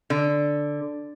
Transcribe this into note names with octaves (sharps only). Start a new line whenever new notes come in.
D3